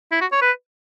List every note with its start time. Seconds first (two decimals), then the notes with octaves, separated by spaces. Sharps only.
0.12 E4
0.21 F#4
0.32 C#5
0.42 B4